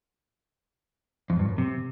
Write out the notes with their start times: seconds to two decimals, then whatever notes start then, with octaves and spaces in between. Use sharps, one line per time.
1.30 F2
1.39 G2
1.49 F#2
1.58 C3